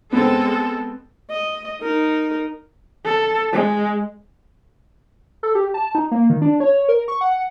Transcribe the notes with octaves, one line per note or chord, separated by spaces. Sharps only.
G#3 B3 C4 A4
D#5
D#4 A#4
A4
G#3
A4
G4
A5
D#4
A#3
D#3
D4
C#5
A#4
C#6
F#5